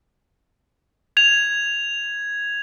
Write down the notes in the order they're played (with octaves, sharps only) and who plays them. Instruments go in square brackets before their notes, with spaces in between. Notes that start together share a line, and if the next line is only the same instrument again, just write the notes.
[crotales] G#6 F7